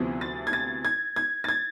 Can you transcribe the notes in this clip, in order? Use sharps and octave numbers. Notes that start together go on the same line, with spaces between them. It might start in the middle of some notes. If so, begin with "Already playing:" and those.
Already playing: D2 C3 F3 B3 E4
A6
G#6
A6
G#6
G#6
A6
G#6